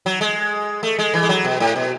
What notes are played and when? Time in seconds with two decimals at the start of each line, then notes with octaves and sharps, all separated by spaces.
0.06 F#3
0.21 G#3
0.83 A3
0.99 G#3
1.14 E3
1.23 G#3
1.29 F#3
1.45 B2
1.60 A2
1.76 B2